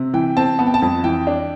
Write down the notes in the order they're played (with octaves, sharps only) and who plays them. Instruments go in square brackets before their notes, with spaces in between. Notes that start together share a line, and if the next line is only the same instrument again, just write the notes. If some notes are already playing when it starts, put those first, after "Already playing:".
Already playing: [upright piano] C3
[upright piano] E3 [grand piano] G5
[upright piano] C4 [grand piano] A5
[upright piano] B3 [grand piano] A5
[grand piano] G5
A5
[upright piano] F2
[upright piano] E3 [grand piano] G5
[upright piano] D4